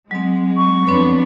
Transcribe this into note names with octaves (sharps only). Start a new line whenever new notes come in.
F#3 G#3 C4
C#6
F2 B3 C4 D4 C#5 B5